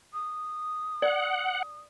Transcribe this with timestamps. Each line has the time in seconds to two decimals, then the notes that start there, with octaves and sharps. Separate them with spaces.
0.13 D#6
1.02 D5 F#5